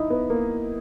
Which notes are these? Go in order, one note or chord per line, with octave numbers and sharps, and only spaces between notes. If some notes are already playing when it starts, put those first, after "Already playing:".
Already playing: D#4 E4
B3
A#3